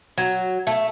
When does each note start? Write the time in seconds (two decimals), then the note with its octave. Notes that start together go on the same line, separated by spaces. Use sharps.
0.18 F#3
0.67 A3